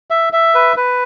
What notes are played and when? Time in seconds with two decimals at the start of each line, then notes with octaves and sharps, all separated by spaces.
0.11 E5
0.33 E5
0.55 B4
0.77 B4